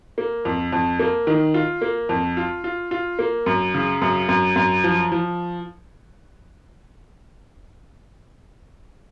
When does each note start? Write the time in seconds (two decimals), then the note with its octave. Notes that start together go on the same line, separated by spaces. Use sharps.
0.18 A#3
0.45 F2
0.72 F2
1.00 A#3
1.27 D#3
1.54 F4
1.82 A#3
2.09 F2
2.37 F4
2.64 F4
2.91 F4
3.19 A#3
3.46 F#2
3.74 C#3
4.02 F#2
4.29 F#2
4.56 F#2
4.84 F3
5.12 F3